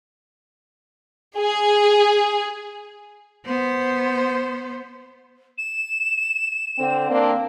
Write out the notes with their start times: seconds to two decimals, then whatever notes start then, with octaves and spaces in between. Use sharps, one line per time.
1.37 G#4
3.45 B3 C5
5.58 E7
6.79 D3 C4
7.10 A#3 C4 D4